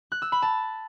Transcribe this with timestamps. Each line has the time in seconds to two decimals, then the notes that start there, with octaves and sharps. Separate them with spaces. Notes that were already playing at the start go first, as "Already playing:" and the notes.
0.12 F#6
0.22 E6
0.32 B5
0.42 A5